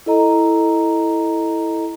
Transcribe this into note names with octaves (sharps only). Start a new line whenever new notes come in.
E4 A4 D#5 A#5